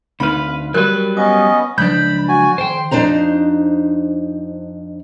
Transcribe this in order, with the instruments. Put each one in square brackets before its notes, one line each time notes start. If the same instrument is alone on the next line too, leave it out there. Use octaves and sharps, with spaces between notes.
[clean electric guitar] D2 B4 [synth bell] C4 D#4 [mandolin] F5 B5
[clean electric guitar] F#3 G3 B4 [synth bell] A#4 [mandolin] F#6
[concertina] B3 C#4 D#5 [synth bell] D#6
[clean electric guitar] C#2 D4 [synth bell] F3 F#3 [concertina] B5 [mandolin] G6
[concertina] F#4 G#5
[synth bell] D#3 [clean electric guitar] C5 G5 [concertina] C6
[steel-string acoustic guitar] F2 D4 D#4 C5 A#5